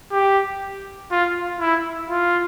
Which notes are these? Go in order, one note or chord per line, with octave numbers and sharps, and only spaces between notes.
G4
F4
E4
F4